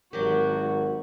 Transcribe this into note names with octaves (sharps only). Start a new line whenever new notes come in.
G#1 F#3 F#4 G4 A#4